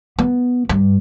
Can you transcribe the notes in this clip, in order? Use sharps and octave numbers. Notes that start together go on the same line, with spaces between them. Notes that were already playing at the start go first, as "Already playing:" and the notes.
B3
G2